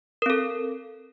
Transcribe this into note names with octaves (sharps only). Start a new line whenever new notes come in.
C4 A4 A#4